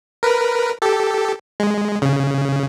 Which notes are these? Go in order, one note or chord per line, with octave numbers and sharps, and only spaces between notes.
A#4 B4
G4 A4
G#3
C#3